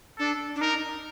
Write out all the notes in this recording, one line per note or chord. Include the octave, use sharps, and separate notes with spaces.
D4 A4
D4
D#4 A#4